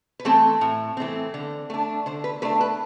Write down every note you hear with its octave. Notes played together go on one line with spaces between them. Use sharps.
B4
E3 A3 C4 A4
A2
E3 A3 C4
D3
A3 D4
D3 C5
B4
A3 D4 B4
B4